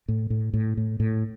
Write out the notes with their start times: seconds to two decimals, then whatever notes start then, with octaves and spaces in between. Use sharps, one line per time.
0.08 A2
0.30 A2
0.54 A2
0.77 A2
1.00 A2